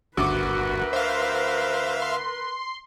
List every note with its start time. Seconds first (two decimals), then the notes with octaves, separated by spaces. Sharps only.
0.17 G1 D2 F#4 A#4 B4 D6
0.93 C5 E5 F5
2.02 C6